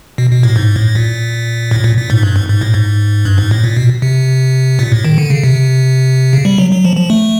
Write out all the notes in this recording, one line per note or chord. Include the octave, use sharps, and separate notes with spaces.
B2
B2
A2
G#2
A2
A#2
A2
A#2
A#2
G#2
G2
G#2
G#2
A2
G#2
G2
G#2
A2
A#2
B2
C3
A#2
A2
D#3
D3
C#3
C3
C#3
G3
F#3
F#3
F3
F3
A3